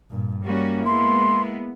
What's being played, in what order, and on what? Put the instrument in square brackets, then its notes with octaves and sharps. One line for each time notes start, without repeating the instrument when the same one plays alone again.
[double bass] G2 A#2
[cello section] G3 C#4 F#4 [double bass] A#3
[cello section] G#3 B3 E4 [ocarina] C6